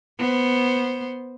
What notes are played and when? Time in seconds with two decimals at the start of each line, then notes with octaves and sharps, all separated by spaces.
0.19 B3 C5